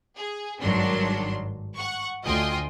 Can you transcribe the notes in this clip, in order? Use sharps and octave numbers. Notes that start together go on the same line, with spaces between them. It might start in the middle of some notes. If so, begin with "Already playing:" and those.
G#4
G#1 G2 D#3 F#3 D4 C6
F#5 C#6
D2 F4 D#5 G5 G#5 C6